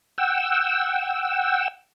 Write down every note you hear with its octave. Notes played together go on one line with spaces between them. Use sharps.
F#5 G5 E6